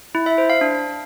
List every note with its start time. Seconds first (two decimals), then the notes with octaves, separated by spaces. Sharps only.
0.15 E4
0.26 E5
0.38 C5
0.50 F5
0.61 D4